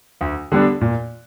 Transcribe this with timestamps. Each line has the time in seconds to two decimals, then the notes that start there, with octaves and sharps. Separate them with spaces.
0.21 D2
0.52 D3 G3 B3 D4
0.81 A#2